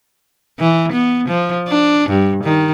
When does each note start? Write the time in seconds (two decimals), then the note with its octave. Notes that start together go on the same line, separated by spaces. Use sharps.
0.59 E3
0.92 B3
1.28 F3
1.68 D4
2.09 G2
2.44 D#3